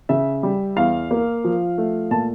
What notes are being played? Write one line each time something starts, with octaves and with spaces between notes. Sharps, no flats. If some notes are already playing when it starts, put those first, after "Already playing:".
C#3 E5
G3
E2 F5
A#3
F3
A3
A#2 A5